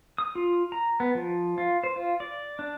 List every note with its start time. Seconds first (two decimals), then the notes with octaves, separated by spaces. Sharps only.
0.18 D#6
0.35 F4
0.72 A#5
1.00 B3
1.15 F3
1.58 F4
1.84 C5
1.96 F4
2.20 D5
2.59 D4